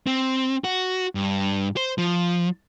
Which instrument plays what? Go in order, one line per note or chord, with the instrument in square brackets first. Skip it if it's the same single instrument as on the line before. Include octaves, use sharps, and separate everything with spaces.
[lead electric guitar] C4
F#4
G2
C5
F3